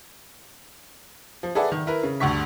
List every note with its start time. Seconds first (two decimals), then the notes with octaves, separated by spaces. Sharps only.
1.43 F3
1.55 G#4 A4 B4 D5 E5 F#5
1.72 D#3
1.87 E4 A#4 B4
2.03 C#3
2.20 D2 G2 D3 C#6 B6